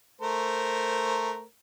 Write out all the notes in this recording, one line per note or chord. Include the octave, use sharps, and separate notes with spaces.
A3 A#4 C5